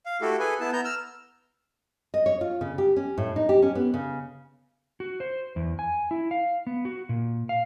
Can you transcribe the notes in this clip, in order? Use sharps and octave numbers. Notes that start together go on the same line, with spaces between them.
F5
A3 E4 F#4 G4 A4
G#4 A4 B4 G#5
B3 E4 A5
B3 A#5 G6
E6 F6
D#5
C#5
F4
C#3
G4
C#4
A2
D#4
G4
C#4
B3
C#3
F#4
C5
E2
G#5
E4
F5
B3
F#4
A#2
F5